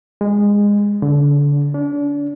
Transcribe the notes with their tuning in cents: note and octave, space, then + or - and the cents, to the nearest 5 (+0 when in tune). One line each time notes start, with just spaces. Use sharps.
G#3 -20
D3 -30
D4 -35